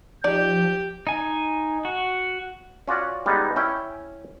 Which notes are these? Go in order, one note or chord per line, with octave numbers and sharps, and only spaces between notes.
F3 D#4 G4 D5 G6
D#4 G#5
F#4
C#4 F4 F#4 D5 F#5
G3 G#3 B3 D#4
C#4 E4 G5